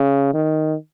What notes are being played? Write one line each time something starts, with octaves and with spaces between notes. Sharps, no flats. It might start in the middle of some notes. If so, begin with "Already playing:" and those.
Already playing: C#3
D#3